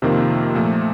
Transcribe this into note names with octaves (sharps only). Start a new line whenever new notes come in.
F2 C3 D#3 A#3 F4
A#2 F3 A3